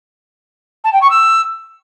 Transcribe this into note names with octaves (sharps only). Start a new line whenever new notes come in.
A5
G5
C#6
E6